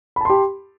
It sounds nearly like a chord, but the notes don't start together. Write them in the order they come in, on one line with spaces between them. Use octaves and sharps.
B5 A5 C6 G4